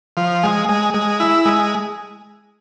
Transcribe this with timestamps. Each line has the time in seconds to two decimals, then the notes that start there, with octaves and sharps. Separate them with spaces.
0.17 F3
0.43 G#3
0.69 G#3
0.94 G#3
1.20 E4
1.45 G#3